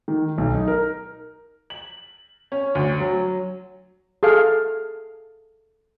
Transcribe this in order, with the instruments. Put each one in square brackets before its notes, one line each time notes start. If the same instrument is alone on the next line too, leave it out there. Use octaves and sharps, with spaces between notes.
[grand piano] D#3
B1
D#4
A#4
[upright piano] F#7
C#4
D2
F#3
[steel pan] G#4 A4 F5